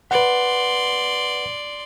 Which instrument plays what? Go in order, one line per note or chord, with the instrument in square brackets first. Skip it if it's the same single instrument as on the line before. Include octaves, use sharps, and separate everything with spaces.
[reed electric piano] B4 F#5 [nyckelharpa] D5 C6